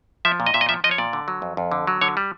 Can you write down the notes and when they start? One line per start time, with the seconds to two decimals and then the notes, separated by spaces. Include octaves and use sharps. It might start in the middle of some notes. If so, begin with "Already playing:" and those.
0.25 F3 E5
0.40 A#2
0.46 D#5
0.54 A#2 E5
0.61 D#5
0.69 F3 E5
0.84 F3 D#5
0.91 C#5
0.98 A#2 D5
1.13 D3
1.28 F#3
1.42 F2
1.57 F2
1.72 D3
1.87 F#3
2.01 D3 C#5
2.17 G3